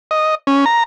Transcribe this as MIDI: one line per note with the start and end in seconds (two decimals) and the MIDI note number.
0.11 0.35 75
0.47 0.65 61
0.66 0.83 82